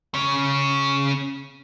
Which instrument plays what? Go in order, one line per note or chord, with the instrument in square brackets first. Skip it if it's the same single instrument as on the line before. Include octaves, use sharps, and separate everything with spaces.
[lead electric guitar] C#3 C#4